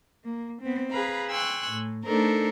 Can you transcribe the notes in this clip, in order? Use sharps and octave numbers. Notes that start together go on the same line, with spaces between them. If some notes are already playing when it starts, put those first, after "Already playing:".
A#3
B3 C4
G#4 B4 F5 A#5 B5
G5 G#5 C6 C#6 E6 F#6
A2
A3 D4 D#4 A4 A#4 C5